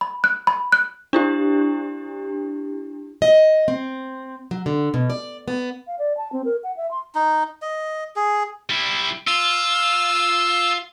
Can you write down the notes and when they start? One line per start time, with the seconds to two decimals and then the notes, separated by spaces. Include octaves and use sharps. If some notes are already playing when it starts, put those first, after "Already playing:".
0.01 B5
0.24 F#6
0.47 B5
0.72 F#6
1.13 D4 E4 G4
3.22 D#5
3.68 C4
4.51 F#3
4.66 D3
4.94 B2
5.10 D5
5.48 B3
5.87 F5
5.99 D5
6.17 A5
6.32 C4
6.45 A#4
6.63 F#5
6.77 E5
6.91 C6
7.15 D#4
7.62 D#5
8.16 G#4
8.69 G3 E4
9.27 F4 E6